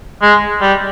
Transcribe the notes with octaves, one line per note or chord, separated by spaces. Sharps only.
G#3
G3